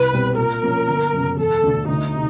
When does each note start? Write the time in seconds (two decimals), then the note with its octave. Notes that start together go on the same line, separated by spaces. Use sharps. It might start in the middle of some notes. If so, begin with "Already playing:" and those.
Already playing: C2 B4
0.12 B2 G3 C4
0.37 A#2 A#4
0.62 F3 A#3 C#4
0.88 G1
1.13 F#2 C#3
1.39 E1 A4
1.63 D2 D3
1.88 D2 D#4
2.14 C3